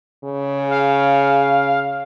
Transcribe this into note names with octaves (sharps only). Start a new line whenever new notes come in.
C#3
F5